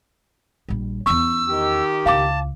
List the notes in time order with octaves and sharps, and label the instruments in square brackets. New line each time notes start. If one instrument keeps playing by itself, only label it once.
[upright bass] A#1 G3
[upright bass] E2 C#4 [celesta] C#6 [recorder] E6
[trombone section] D#3 G4
[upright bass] C#2 E4 [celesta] F5 D6 [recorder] A5